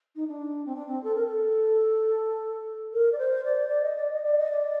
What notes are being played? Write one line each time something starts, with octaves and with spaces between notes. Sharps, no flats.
D#4
D4
C4
D4
C4
A4
A#4
A4
A#4
D5
C5
D5
D5
D#5
D5
D#5
D5
D#5
D5